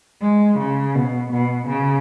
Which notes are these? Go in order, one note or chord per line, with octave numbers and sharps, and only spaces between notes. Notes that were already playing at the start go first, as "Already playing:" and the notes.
G#3
C#3
B2
B2
C#3